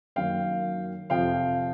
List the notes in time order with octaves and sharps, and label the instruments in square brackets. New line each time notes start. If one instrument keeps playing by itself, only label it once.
[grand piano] F#2 D#3 F#3 A#3 F5 G5
F2 C3 F3 F5 G5